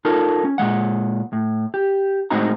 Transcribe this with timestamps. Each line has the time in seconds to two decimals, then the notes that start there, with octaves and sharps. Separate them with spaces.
0.05 D#4 F4 A4 A#4
0.44 C#4
0.58 A#2 C#3 G#3 F#5
1.33 A2
1.74 G4
2.30 A2 G#3 C4 D#4 F#4 A#5